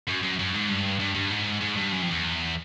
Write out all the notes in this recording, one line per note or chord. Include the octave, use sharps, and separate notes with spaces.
F#2
F#2
F#2
G#2
G2
G2
G2
G#2
G#2
G2
F#2
F2
E2